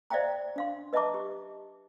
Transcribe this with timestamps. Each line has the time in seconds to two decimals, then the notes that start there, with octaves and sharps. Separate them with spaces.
0.10 C5 D5 E5 F5 G5 A#5
0.56 D4 F5 C6
0.93 B4 D#5 E5 A5 A#5 D6
1.14 G4